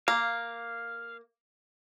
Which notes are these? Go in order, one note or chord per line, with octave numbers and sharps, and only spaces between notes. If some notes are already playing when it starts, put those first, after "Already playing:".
A#3 F5